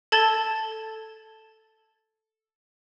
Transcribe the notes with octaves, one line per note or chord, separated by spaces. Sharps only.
A4 A5 G#6 A6 G7